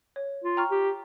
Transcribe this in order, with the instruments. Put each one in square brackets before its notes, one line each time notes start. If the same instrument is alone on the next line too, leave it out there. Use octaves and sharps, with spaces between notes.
[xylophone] C#5
[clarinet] F4
[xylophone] G5 A#5 C#6 F6
[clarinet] G4